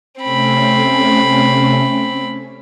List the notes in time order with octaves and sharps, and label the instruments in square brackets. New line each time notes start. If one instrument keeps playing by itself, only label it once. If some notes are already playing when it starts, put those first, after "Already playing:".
[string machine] C3 A3 C#4 [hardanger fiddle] C4 B5